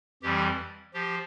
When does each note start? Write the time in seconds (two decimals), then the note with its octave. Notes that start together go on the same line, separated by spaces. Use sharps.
0.23 F2 E3 G3 G4
0.94 F3 G4